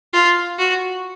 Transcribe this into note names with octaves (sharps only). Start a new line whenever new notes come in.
F4
F#4